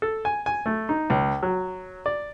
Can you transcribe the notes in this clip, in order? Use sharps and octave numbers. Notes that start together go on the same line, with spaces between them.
A4
G#5
G#5
A3
D#4
C#2
F#3
D5